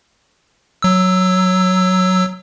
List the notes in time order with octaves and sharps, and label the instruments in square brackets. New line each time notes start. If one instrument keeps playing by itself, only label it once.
[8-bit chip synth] F#3 E6